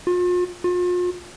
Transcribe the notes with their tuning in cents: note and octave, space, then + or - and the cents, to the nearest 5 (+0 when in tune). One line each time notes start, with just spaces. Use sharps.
F4 +40
F4 +40